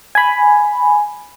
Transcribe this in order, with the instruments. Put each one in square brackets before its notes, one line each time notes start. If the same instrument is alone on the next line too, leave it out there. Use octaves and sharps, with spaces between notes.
[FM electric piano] G#5 B5